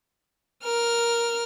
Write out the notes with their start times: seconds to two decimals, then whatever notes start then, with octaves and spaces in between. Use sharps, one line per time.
0.63 A#4 F6